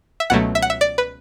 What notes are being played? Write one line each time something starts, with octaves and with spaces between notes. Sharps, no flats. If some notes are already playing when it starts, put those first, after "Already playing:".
E5
C#2 B2 F#3 A3 F#5
E5
F#5
E5
D5
B4